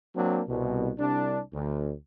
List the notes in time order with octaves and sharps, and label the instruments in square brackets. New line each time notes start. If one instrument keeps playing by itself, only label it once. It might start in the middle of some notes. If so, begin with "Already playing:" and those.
[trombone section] F#3 A#3 C4 D4
C2 B2
C2 D4
D2